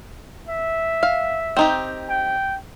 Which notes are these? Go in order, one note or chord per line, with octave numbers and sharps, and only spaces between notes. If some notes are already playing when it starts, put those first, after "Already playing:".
E5
F5
C4 D#4 G4
G5